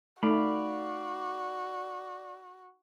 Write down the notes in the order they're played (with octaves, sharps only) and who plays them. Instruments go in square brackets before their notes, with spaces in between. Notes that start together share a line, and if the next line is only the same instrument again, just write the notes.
[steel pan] A3 [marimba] D#4 [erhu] F#4 [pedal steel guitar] D5 F5 B5